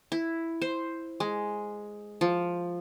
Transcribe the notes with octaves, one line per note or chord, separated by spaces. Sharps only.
E4
C5
G#3
F3